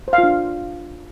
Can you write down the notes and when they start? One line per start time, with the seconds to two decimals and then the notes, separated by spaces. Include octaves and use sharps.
0.08 C5
0.13 F5
0.18 F4
0.23 D4